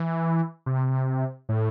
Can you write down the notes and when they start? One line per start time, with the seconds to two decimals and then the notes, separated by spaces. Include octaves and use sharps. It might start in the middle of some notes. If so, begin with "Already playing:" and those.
Already playing: E3
0.66 C3
1.49 A2